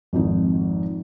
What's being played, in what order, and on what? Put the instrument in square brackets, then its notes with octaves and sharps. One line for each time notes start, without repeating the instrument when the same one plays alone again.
[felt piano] G#1 F2 D#4